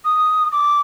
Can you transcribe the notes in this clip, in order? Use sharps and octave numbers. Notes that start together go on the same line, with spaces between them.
D#6
D6